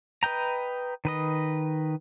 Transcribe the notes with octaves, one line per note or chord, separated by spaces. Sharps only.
B4 D#5 G5 A#5
D#3 B4 D#5